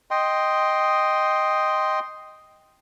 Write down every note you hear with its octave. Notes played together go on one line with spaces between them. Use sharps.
D#5 G5 C6